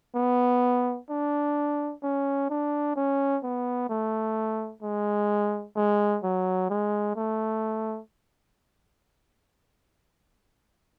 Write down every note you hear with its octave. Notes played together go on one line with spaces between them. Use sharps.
B3
D4
C#4
D4
C#4
B3
A3
G#3
G#3
F#3
G#3
A3